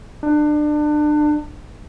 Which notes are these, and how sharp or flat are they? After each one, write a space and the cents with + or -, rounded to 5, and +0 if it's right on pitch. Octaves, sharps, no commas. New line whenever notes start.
D4 +30